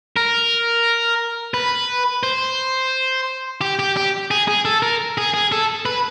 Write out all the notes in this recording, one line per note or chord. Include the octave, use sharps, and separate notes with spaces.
A#4
B4
C5
G4
G4
G4
G#4
G#4
A4
A#4
G#4
G#4
A4
B4